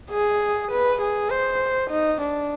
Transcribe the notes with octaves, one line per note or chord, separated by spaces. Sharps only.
G#4
B4
G#4
C5
D#4
D4